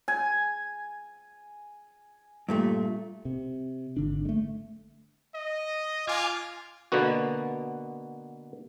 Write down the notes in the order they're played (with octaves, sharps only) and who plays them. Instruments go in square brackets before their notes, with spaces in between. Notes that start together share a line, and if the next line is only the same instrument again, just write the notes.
[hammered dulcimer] G#5
[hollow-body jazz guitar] G2 A#2 A3
[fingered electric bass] C3
G#1 D3 D4
G#3 A3
[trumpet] D#5
[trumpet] F4 [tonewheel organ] G#5 D6 F6
[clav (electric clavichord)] B2 D3 A#3 B3 F#4